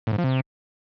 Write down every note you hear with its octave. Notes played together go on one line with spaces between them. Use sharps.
A2
G#2
F3
C3